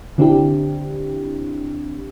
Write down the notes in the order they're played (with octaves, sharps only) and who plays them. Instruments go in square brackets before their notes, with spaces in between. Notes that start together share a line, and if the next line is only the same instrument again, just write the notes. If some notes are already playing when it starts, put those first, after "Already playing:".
[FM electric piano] D3 C4 D4 E4 G4